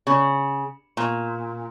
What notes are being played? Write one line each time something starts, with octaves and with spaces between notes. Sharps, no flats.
C#3
A#2